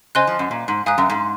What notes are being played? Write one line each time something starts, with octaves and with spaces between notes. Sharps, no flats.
C#3 C5 D#5 G#5 C6 F#6
F3
F#2
A#2
G#2
G#2 F5 G#5 D#6 F#6
F#2
G#2